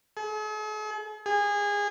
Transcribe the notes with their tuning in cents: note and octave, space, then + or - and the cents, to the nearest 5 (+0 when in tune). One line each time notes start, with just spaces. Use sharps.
G#4 +45
G#4 -25